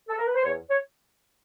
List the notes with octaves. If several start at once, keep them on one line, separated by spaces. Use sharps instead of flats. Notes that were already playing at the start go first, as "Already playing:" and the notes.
A4
A#4
B4
C5
E2 C#5
C#5